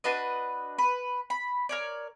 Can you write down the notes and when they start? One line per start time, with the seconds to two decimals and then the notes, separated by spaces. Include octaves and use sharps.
0.04 D4 F#4 B4 D#5
0.78 B4
1.30 B5
1.69 A#4 C#5 D5